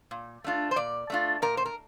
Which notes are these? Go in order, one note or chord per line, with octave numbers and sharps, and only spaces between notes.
A#2
A3 D4 F4
C5
A#2 D5
A3 D4 F4
A#2 A#4
C5
A#4